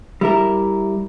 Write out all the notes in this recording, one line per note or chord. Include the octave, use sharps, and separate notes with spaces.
G3 E4 A#4